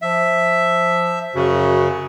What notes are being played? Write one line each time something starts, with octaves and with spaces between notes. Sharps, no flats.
F3 E5
F#2 C#3 F#4